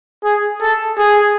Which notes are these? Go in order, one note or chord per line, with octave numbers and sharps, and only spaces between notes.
G#4
A4
G#4